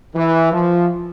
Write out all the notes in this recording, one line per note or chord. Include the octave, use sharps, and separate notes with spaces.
E3
F3